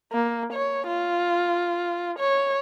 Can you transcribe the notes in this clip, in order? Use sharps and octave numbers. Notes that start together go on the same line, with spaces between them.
A#3
C#5
F4
C#5